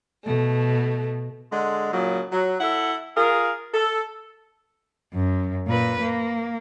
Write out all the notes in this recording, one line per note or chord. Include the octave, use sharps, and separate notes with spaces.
B2 A3
D3 G#3
A#2 C#3 F#3
F#3
E4 A4 F#5
F4 G#4 A#4
A4
F#2
A#2 B4
A#3